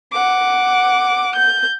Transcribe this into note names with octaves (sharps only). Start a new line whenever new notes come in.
F#5 D6
G6